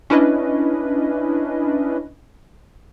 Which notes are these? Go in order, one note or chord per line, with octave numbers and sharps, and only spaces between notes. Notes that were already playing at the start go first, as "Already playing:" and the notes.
C#4 D4 E4 B4 D#5